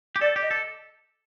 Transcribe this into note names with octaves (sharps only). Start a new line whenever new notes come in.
G4
A4 D5
G4
D#5
A4